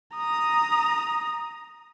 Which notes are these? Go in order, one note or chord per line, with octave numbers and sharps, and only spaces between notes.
A#5 D#6